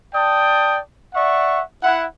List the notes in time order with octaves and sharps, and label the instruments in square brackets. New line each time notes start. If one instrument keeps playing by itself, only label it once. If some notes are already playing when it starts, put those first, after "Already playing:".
[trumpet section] D5 G5 A5 D#6
D5 E5 F#5 C#6
E4 F#5